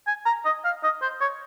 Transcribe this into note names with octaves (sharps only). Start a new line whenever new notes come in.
G#5
A#5
D#5
F5
D#5
C5
C#5